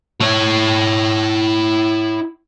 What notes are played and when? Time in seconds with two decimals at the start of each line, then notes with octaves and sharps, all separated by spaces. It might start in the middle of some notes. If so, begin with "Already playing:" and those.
0.21 E4 C#5